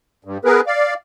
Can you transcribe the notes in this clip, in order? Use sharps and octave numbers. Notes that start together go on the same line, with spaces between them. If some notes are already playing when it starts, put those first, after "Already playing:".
G2
B3 G#4 A#4 B4
D5 F5